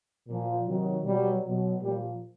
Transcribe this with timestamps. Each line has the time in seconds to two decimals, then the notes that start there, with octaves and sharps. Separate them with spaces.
0.28 A#2 F3
0.67 C3 D#3 F#3
1.05 B2 F#3 G3
1.43 B2 F#3
1.82 A#2 F3 G3